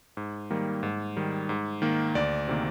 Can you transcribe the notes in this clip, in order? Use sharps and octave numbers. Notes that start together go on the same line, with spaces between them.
G#2
D#3 G3 A#3
G#2
D#3 G3
G#2
D#3 A#3
D2 D5
C3 D#3 A#3